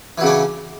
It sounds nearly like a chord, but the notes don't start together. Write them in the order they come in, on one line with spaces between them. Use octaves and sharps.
E3 F#3 C#3 D4 C#4